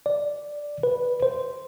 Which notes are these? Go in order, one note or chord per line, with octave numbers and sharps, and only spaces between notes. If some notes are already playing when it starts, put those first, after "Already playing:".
D5
B4
C5